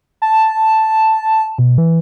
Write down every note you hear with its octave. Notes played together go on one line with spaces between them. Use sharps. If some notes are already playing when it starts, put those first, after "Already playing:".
A5
B2
E3